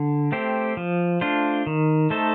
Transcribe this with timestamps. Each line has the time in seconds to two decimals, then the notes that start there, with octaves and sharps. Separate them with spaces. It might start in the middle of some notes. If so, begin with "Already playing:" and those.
Already playing: D3
0.32 A3 C4 G4 C5
0.77 F3
1.21 A3 D4 F4 C5
1.67 D#3
2.10 A3 D#4 A4 C5